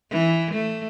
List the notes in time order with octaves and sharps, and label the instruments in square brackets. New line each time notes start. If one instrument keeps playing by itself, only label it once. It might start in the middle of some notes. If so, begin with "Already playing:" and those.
[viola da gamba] E3
A3